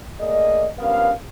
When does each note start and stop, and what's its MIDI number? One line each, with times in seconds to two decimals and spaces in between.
0.20 0.67 57
0.20 0.67 58
0.20 0.67 68
0.20 0.67 74
0.20 0.67 75
0.78 1.12 43
0.78 1.12 53
0.78 1.12 59
0.78 1.12 61
0.78 1.12 70
0.78 1.12 77